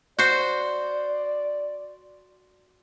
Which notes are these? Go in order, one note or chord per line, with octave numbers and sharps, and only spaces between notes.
F#4 C5 D5